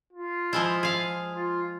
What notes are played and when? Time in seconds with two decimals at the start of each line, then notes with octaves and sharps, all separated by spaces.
0.13 F4
0.53 F3 G#3 E4
0.83 G#4 F5
1.35 F4